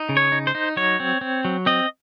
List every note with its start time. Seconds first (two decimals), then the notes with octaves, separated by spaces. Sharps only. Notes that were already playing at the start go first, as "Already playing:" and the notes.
Already playing: D#4
0.09 C#3
0.17 C#5
0.32 D#4
0.47 C5
0.55 D#4
0.77 F#3 C#5
1.00 C4
1.21 C4
1.45 F#3
1.66 C4 D#5